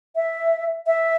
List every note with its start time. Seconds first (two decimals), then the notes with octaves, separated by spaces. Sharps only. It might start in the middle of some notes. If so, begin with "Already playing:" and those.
0.16 E5
0.87 E5